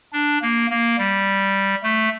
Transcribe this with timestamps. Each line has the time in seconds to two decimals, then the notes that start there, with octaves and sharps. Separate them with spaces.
0.12 D4
0.42 A#3
0.70 A#3
0.98 G3
1.83 A3